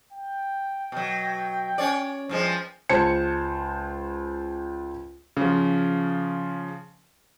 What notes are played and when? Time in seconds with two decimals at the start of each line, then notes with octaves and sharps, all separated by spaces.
0.13 G5
0.92 B2 F#3
1.78 C#4 C#5 D5
2.29 G2 F3 G#3
2.89 C#2 C5 A5 G#6 C#7
5.37 C#3 F3